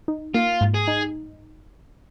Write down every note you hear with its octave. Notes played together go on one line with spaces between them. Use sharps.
D#4
A#3 F4
G#2
G#4
D#4